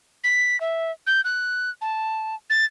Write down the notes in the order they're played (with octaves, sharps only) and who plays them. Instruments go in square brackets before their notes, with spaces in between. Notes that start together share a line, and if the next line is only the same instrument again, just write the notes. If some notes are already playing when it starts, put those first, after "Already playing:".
[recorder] B6
E5
G6
F#6
A5
A6